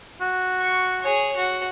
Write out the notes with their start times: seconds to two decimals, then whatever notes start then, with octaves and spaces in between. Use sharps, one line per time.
0.21 F#4
0.61 C#6
1.01 G#4 C#5
1.36 F#4